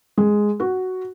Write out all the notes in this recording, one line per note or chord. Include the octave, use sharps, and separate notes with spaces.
G#3
F#4